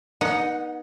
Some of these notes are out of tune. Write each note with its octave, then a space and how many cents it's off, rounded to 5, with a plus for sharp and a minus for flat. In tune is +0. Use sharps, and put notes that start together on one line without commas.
B3 -35 D#4 +0 F#5 +0